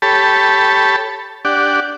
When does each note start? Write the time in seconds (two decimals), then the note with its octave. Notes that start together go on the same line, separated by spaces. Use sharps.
0.02 G4 A4 C#5 A5 B5
1.45 D4 G4 D5 F#5